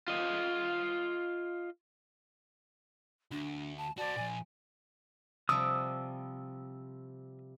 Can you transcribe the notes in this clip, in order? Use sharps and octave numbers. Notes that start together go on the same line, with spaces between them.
F4 D#5
D2 D4
A5
F#4 C5 D5 A5
A#2 F3 G#5
C3 F3 G3 D#6 E6